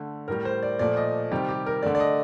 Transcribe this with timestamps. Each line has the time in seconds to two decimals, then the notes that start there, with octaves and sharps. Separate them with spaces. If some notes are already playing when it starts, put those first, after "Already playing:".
Already playing: D3 A3
0.28 A2 G3 A#4
0.45 C5
0.62 D5
0.79 A#2 F3 A3 D5
0.97 D#5
1.31 C3 D#3 G3 G4
1.49 G4
1.66 A#4
1.82 D3 A3 D5
1.95 D5
2.00 D#5